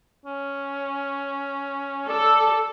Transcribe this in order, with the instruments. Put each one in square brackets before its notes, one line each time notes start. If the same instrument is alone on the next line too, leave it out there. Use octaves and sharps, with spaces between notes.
[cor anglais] C#4
[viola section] A4 [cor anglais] D5